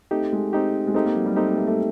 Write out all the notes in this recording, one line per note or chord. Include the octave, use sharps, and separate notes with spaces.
A3 C4 D#4 G4
G#3
C4 D#4 G4
G#3
A3 C4 D#4 G4
A#3
F#3
G3
A3 C4 D#4 G4
A#3
A3
A3